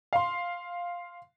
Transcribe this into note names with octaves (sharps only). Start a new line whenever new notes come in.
F5 C6